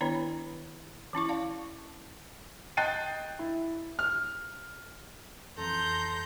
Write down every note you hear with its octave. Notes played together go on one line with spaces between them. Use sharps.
D#3 B3 D4 E4 C#5 D5
E3 C#4 E4 C#6
D5 F5 A5
D#5 G5 F#6 A6 C7 D#7
E4
F6
F2 E3 A4 A#5 C6 G6